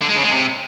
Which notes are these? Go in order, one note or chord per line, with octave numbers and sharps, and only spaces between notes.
D3
G#3
C#3
G#3
C3